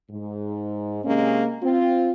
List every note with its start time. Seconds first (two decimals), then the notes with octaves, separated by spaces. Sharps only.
0.11 G#2
1.04 C3 G#3 A#3 C#4
1.62 C4 F4